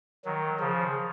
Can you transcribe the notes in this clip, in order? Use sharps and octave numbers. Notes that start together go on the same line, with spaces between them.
D#3 F#3
C#3 F3